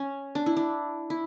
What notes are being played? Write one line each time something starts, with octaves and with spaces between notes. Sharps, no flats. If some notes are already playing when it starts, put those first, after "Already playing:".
Already playing: C#4
D4
E4
D4
E4